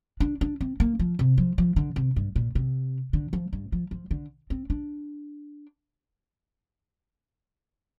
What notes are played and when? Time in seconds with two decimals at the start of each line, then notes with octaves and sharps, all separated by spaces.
0.20 D4
0.41 D4
0.61 C4
0.80 A#3
0.99 F3
1.19 C3
1.38 F3
1.58 F3
1.76 D3
1.96 C3
2.16 G2
2.36 A#2
2.55 C3
3.13 D3
3.33 F3
3.53 G2
3.72 F3
3.91 F3
4.11 D3
4.50 C4
4.70 D4